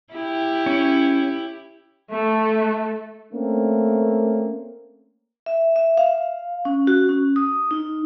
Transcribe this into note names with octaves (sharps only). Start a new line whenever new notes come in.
E4 G4
C#4
A3 A4
A3 A#3 C4 C#4
E5
E5
F5
C#4
F#4
C#4
D#6
D#4